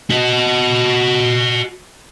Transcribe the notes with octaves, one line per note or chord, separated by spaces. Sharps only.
F#4 D#5